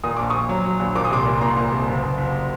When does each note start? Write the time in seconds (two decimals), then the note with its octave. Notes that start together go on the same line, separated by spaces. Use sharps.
0.04 A#2 D#6
0.17 A#1 D6
0.30 A#1 C#6 D#6
0.49 F#3
0.65 F#3
0.80 A#1
0.95 A#2 D6
1.05 D#6
1.10 C2 C6 D6
1.26 A#2
1.41 A#2 A#5 C6
1.57 A#2
1.72 C2
1.87 F#1
2.03 F#1
2.18 F#1